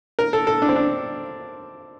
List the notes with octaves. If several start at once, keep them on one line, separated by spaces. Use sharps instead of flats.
A#4
A4
A4
D4
C4
D4